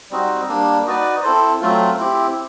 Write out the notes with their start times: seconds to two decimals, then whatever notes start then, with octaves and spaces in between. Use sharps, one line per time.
0.11 G3 C4 D#4 F#4
0.48 G3 A#3 D4
0.86 D#4 F#4 B4 D5
1.23 C4 E4 A4 C5
1.61 F#3 A3 C4 F4
1.97 C4 E4 G4